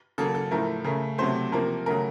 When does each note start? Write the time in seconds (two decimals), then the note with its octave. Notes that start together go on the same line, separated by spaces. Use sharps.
0.18 C#3 F#3 A#3 A4
0.35 A4
0.51 A2 F3 A3 A#4
0.84 C#3 A3 A#4
1.18 C3 F#3 A3 C5
1.52 C3 F3 A#3 A#4
1.86 C#3 F#3 A3 A#4